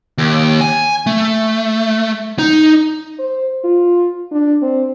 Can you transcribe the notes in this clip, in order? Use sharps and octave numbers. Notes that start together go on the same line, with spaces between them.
D#2
G#5
A3
D#4
C5
F4
D4
C4